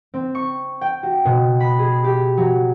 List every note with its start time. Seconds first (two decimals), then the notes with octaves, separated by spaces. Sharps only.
0.14 C4
0.35 C#6
0.81 G5
1.03 F#4
1.25 B2
1.60 B5
1.79 G#4
2.04 G4
2.37 F#3